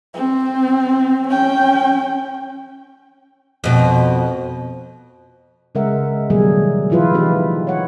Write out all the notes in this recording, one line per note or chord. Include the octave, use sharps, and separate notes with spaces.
C4
C#4 G5
F2 B2
C#3 G#3 A#4 E5 F#5
B2 D#3 F#3 G3 A3 G#4
E3 F3 E4 F4 B4
E3 A3 D#4 G4 B4
C#5 F#5